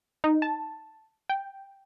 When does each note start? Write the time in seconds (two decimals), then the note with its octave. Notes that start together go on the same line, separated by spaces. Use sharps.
0.24 D#4
0.42 A5
1.29 G5